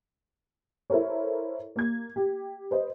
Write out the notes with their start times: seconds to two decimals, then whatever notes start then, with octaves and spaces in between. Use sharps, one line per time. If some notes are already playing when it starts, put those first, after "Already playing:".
0.90 E4 A4 A#4 C5 C#5
1.76 A#3 G#6
2.16 G4
2.71 B4 C5 D#5